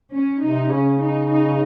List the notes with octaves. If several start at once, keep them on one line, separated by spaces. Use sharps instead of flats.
C#4
C3 D#4
C#3 C#4
D#4
D#4